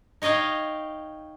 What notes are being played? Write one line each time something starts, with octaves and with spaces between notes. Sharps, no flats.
D#4 C#5 D#5 F5 G5